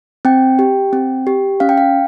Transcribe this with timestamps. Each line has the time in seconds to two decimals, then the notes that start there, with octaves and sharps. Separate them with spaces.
0.25 C4 G5
0.59 G4
0.93 C4
1.27 G4
1.60 C#4 F5
1.69 G5
1.78 F5